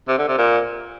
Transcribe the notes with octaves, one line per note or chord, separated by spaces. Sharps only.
C3
D3
C3
A#2